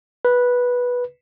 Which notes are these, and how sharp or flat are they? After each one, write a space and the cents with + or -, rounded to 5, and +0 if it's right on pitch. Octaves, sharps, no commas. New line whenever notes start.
B4 -10